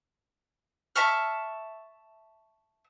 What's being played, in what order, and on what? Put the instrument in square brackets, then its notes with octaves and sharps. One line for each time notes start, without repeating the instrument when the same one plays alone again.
[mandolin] E5 A5 C#6 F6